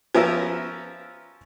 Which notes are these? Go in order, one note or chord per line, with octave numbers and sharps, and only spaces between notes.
F3 B3 C#4 A#4 E5